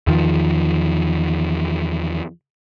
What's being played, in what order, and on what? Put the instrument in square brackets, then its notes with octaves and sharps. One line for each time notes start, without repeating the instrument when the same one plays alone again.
[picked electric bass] E2 D#3 F3